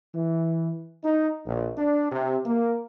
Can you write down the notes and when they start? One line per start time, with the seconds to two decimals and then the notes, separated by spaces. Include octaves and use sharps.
0.15 E3
1.05 D#4
1.46 A#1
1.77 D4
2.12 C3
2.46 A#3